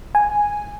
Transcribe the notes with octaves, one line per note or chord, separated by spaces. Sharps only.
G#5